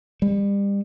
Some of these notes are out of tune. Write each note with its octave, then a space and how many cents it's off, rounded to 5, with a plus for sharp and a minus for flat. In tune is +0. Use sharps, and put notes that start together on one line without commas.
G3 +35